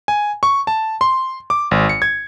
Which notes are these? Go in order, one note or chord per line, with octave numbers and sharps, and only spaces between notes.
G#5
C#6
A5
C6
D6
G#1
C#7
G#6